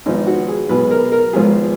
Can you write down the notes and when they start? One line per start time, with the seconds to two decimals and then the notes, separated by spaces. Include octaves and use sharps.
0.06 G#1 G#2 F3 B3 D#4
0.27 F#4
0.48 G#4
0.69 B1 B2 G#3 B3 B4
0.91 A#4
1.12 A#4
1.33 G#1 G#2 F3 G#3 B3 G#4